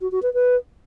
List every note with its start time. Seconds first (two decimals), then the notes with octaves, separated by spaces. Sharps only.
0.01 F#4
0.12 F#4
0.23 B4
0.34 B4